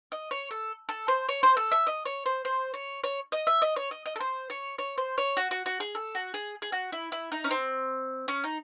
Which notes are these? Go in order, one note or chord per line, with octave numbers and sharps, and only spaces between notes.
D#5
C#5
A4
A4
C5
C#5
C5
A4
E5
D#5
C#5
C5
C5
C#5
C#5
D#5
E5
D#5
C#5
D#5
D#5
A4
C5
C#5
C#5
C5
C#5
F#4
F#4
F#4
G#4
A4
F#4
G#4
G#4
F#4
E4
E4
D#4
C#4
C4
C#4
D#4